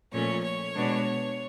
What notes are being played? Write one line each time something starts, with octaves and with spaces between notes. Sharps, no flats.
A#2 F3 A3 C#4 C#5
C#5
B2 G#3 B3 D4